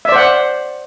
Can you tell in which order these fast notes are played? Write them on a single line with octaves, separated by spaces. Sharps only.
E5 D5 C5 F#5